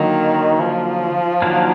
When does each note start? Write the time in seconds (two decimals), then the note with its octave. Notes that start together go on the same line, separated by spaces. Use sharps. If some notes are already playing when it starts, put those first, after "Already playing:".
Already playing: D3 D#3 F#3 A#3
0.59 F3
1.42 D#3 F#3 A#3 D4